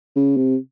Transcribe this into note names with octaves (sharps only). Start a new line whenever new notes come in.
C#3
C3